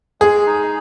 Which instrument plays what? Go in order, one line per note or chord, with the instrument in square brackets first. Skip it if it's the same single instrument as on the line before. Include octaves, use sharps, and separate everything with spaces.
[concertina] G#3 [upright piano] G#4
[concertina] D#4